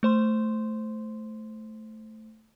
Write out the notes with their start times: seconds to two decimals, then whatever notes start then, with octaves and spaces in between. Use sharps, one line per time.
0.03 A3 C5 C6